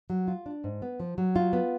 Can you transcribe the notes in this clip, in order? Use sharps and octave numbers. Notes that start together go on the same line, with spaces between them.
F#3
F4
D4
G#2
B3
F3
F#3
F4
B3